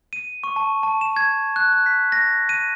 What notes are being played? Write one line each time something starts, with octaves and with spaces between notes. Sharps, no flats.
D#7
C#6
A5
A5
E7
G#6
F#6
F#6
B6
A#6
D#7